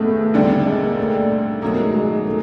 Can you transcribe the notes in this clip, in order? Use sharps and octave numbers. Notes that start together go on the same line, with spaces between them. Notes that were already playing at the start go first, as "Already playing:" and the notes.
Already playing: B1 A2 G#3 A3 B3
D#2 D3 G3 C4
G#3
A#3
A3
B2 F#3 A3 A#3 D#4
G#3
G#3
A3